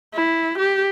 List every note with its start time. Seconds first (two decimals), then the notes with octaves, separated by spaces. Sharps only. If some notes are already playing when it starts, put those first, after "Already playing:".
0.14 E4
0.59 G4